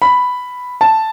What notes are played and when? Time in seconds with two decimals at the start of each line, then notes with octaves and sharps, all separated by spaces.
0.02 B5
0.81 A5